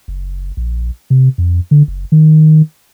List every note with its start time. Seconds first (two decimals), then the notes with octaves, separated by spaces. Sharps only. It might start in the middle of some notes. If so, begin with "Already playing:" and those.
0.08 F#1
0.57 A#1
1.10 C3
1.38 F2
1.71 D3
1.88 F#1
2.12 D#3